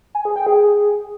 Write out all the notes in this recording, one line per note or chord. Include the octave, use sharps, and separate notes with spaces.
G#5
G#4
G5
G#4